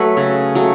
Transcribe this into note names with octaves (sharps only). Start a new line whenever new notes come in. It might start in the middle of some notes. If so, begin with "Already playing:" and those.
Already playing: F#3 A3 B4 C#5
C#3
F#3 A3